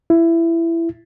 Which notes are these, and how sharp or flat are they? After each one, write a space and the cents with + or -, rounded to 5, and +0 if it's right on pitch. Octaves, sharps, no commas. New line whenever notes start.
E4 +15